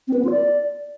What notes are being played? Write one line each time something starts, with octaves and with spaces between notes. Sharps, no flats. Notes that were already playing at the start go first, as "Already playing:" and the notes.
C4
B4
B3
F4
D5